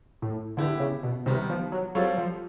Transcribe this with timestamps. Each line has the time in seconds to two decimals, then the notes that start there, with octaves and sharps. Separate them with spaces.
0.22 A2
0.57 D3 B3 E4 G4
0.80 C#3
1.03 B2
1.26 C3 D#3 G3 B3
1.50 F3
1.72 F#3
1.95 F#3 G3 C4 F4 A4 C#5
2.18 F3